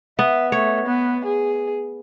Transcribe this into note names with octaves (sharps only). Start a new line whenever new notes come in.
B3 E5
A3 C#5
B3
G#4